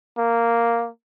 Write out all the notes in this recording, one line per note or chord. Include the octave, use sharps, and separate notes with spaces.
A#3